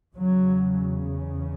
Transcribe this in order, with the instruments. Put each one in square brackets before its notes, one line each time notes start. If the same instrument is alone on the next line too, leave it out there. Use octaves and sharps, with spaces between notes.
[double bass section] E2 C#3 F#3